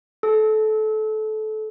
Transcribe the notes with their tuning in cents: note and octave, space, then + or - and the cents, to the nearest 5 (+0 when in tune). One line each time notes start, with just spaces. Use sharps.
A4 -25